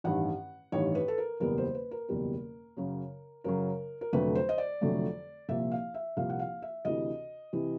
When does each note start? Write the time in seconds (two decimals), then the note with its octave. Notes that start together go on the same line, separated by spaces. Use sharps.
0.04 A1 G2 D#3 F#5
0.72 A1 G2 D#3 C#5
0.95 B4
1.08 A4
1.18 A#4
1.40 F#1 E2 B2 G3 B3 A#4
1.58 C5
1.75 B4
1.91 A#4
2.08 F#1 E2 B2 G3 B3
2.77 F#2 C#3 F#3
3.44 F#2 C#3 F#3 A#4
4.01 A#4
4.13 F1 F2 D3 F#3 A3 B4
4.35 C5
4.49 D#5
4.58 D5
4.81 F1 F2 D3 F#3 A3
5.49 C2 A#2 F3 A#3 E5
5.71 F5
5.94 E5
6.17 C2 A#2 F3 A#3 F5
6.29 F#5
6.39 F5
6.62 E5
6.85 D2 C3 E3 D#5
7.53 C3 E3